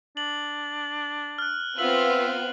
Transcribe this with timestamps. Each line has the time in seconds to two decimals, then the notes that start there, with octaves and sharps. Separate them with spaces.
0.17 D4 F#7
1.38 F6 F#6
1.79 B3 C4 F4 E5 F#7